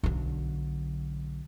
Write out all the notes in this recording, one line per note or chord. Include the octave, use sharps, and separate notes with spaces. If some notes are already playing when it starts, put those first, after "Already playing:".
B1 D3